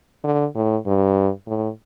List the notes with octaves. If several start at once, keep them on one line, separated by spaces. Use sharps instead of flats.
D3
A2
G2
A2